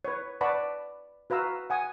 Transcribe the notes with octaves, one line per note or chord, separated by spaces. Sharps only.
B4 C#5
B4 D5 F#5 A5 B5 C#6
F#4 B4 F5 A#5 E6
F#5 G#5 D#6